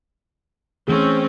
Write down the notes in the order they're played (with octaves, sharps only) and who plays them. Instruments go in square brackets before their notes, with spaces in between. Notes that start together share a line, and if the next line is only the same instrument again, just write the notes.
[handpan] E3 A3 G#4 [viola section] C4 C#4